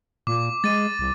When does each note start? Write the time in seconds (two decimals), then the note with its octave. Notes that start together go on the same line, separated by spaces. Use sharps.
0.27 A#2 D6
0.64 G#3 A6 D#7
0.99 C2